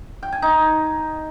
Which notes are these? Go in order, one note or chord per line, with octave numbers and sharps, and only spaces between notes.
G5
G#5
D#4